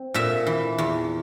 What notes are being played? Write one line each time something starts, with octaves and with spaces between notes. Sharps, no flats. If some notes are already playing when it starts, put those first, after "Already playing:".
Already playing: C4
A#2 E5
E3
E2